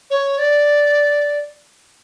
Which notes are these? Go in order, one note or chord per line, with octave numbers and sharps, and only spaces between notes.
C#5
D5